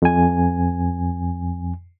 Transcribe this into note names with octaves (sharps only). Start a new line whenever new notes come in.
F2 G#5